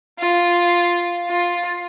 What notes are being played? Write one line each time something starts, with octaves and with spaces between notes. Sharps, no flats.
F4
F4